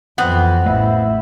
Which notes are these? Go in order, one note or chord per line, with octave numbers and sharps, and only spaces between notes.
F2 E3 B3 C4 F#5
A1 A3 E4 D#5 F5